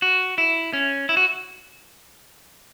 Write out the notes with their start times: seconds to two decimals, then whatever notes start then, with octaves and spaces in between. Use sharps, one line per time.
0.02 F#4
0.38 E4
0.73 C#4
1.09 E4
1.17 F#4